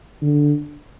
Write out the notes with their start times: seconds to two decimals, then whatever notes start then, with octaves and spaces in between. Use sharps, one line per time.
0.22 D3